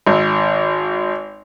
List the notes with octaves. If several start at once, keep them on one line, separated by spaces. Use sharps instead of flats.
G#1